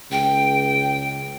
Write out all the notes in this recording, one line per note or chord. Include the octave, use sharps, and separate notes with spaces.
C#2 G5